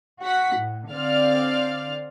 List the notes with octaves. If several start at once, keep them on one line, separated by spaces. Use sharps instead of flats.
F#4 F#5 B6
A2
D3 C4 D5 F5 F6